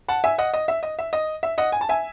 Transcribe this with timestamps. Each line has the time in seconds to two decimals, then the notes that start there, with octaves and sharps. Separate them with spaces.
0.08 F#5 A5
0.24 E5 G#5
0.38 D#5 F#5
0.54 D#5
0.68 E5
0.83 D#5
0.99 E5
1.13 D#5
1.43 E5
1.58 D#5 F#5
1.72 G#5
1.81 A5
1.89 E5 G#5